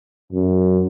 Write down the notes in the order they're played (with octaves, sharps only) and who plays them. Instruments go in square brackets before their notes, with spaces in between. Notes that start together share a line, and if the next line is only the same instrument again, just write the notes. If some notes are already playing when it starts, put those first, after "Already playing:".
[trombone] F#2